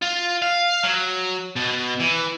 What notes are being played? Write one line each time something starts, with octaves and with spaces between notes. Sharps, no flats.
F4
F5
F#3
B2
E3